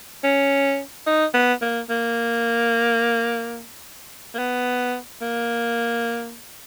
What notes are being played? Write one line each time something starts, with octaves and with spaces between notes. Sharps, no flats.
C#4
D#4
B3
A#3
A#3
A#3
B3
A#3